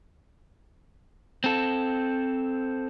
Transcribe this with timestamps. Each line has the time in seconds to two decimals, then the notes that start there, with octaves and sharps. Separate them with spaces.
1.44 C4 A4